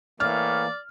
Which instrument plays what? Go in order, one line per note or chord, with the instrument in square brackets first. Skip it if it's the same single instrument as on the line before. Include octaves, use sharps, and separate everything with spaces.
[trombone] A2 [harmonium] E3 A#3 [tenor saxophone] D5 [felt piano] F6